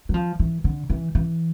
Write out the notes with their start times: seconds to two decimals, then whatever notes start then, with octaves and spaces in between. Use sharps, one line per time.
0.09 F#3
0.14 F3
0.39 E3
0.64 D3
0.90 E3
1.15 E3